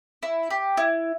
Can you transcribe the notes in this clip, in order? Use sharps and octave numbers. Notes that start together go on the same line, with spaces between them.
E4
G4
E4